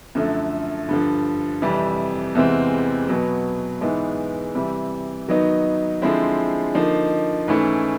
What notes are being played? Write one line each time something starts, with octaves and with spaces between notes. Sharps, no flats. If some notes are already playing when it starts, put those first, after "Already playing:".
F#2 D3 F3 A3
G2 D3 F3
F2 C3 E3 G3
E2 C3 E3 G#3 C4
B2 F#3 B3
G#2 E3 G#3 B3
C3 E3 G3
D#3 F#3 B3 D#4
D3 F3 G#3 C4 E4
D3 F3 A#3 D#4
G#2 E3 A3 C#4 E4